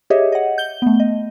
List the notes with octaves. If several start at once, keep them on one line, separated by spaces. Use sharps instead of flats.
G4 G#4 C#5 D#5 E5
D#5 F#5
G6 G7
A3 B3
D#5